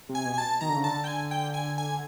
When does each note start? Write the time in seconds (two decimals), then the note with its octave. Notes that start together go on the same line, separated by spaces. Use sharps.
0.09 C3
0.15 G#5
0.25 B2
0.34 G#5
0.38 A5
0.61 D#3 A#5
0.69 D3
0.76 C#3
0.84 D3 A5
1.04 G5
1.08 G#5
1.31 G5
1.54 G#5
1.78 G#5